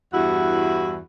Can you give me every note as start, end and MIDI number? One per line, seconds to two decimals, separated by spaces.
0.13 0.98 40
0.13 0.98 43
0.13 0.98 64
0.13 0.98 66